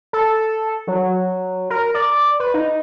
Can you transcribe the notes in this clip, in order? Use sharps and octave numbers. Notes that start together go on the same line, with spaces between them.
A4
F#3
A#4
D5
B4
D#4